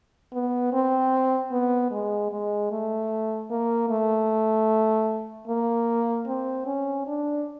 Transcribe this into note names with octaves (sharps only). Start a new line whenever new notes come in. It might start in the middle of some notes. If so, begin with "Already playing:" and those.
B3
C4
B3
G#3
G#3
A3
A#3
A3
A#3
C4
C#4
D4